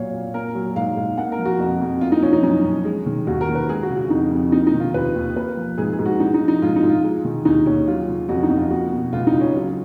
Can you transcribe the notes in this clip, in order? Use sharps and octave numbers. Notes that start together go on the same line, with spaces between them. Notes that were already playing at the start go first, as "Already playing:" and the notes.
Already playing: A#2 F#3 A#3 C#5 F5
A#2
A#3 A#4
F#3
G#2 F5
G#2
A#3 F#5
A#4
F3
F#4
F2 F#4
F2
A#3 F4
D#4
F3 C#4
D#4
F#2 D#4
F#2
G#3
D#3
D#2 F#4
A#4
D#2
B4
G#3 G#4
F#4
C#3
F#4
F2 D#4
F2
A#3 D#4
D#4
D#3
F4
D#2 B4
D#2
A#3 B4
F3
G#2 G#4
G#4
G#2
F#4
G#3 D#4
D#4
F3
D#4
G#2 F4
D#4
G#2
F4
G#3
D#3
D#2 D#4
D#2 C#4
F#3 F4
C#3
F2 F#4
D#4
F2
F4
A#3 F#4
B2
C#2 F4
D#4
C#2
C#4
F#3 F4